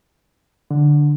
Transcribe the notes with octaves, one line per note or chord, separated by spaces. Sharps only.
D3